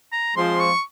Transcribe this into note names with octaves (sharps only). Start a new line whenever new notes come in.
A#5
F3 G#3 C4 F4 C5 C6
C#6